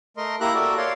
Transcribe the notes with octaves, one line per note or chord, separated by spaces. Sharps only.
A3 A#4 D#5 C6
A#3 E4 G4 E5 A#5 F#6
F#4 A4 A#4 D5 E5
C#5 D5 F5 C6